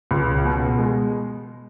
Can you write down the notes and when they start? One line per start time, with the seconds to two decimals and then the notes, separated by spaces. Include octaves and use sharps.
0.11 C#2
0.45 B2
0.79 G#3